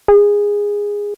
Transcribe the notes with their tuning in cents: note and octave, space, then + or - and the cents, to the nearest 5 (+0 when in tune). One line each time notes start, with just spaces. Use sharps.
G#4 -15